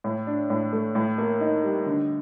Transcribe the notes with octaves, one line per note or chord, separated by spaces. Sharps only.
A2
D4
A2
A3
A2
A#3
D#4
G3
D3